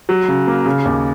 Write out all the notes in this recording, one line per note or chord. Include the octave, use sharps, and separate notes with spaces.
F#3
C#3
A#3
C#3
D#2